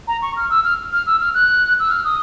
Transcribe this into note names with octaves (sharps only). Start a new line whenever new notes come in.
A#5
C#6
F6
E6
F6
F6
E6
F6
F#6
E6
F6
D#6